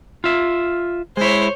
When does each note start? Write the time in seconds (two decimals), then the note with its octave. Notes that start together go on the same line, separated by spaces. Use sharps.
0.24 F4 E5
1.17 G#3 E4 C5 C#5